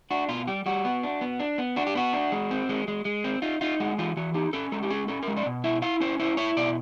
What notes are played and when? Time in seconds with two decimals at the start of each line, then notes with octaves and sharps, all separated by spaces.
0.10 D4 F#4
0.28 B2 F4
0.47 G3 G4
0.66 G3 F#4
0.85 B3
1.03 D4
1.21 B3
1.40 D4
1.58 B3
1.76 D4 F#4
1.87 G4
1.95 B3 F#4
2.13 D4
2.32 G#3
2.51 C4
2.69 G#3
2.88 G#3
3.05 G#3
3.24 C4
3.42 D#4 F4
3.61 D#4 F4
3.80 G#3 F#4
3.98 E3 F4
4.17 E3 F#4
4.34 D#4 G4
4.53 C#4 A4
4.72 G#3 A4
4.83 G4
4.90 C#4 G#4
5.08 C#4 A4
5.23 A#4
5.28 G#3
5.37 D5
5.46 B2
5.64 E4 E5
5.82 E4 F5
6.00 C#4 C5
6.20 E4 C5
6.37 E4 C#5
6.57 B2 D5